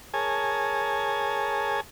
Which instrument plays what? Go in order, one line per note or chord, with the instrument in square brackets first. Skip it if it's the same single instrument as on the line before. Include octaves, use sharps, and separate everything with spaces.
[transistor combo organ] G#4 A#4 C#5 G#5 A5